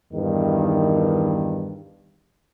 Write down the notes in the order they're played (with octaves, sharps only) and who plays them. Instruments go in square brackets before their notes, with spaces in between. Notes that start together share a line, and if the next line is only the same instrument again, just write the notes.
[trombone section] E2 G2 D#3